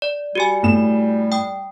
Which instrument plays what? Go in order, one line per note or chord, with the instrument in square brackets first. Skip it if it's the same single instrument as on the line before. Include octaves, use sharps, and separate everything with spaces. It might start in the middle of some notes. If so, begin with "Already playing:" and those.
[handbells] D5
[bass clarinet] G3 [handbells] F#4 G4 G#5
[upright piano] A2 E7
[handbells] G5 D#6